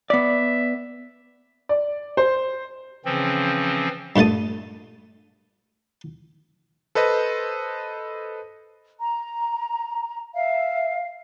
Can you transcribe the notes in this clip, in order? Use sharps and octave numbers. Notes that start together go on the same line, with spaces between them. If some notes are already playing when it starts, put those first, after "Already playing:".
B3 D5 E5
D5
C5
C#3 E3 F3 C4
G2 A#2 A3 A5 D#6
A4 B4 C5 D#5
A#5
E5 F5